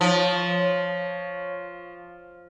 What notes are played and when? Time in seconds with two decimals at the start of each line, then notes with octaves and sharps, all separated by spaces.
0.01 F3 C#5